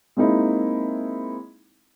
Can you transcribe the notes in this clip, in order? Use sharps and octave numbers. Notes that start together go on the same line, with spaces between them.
G#3 A#3 C4 D#4 E4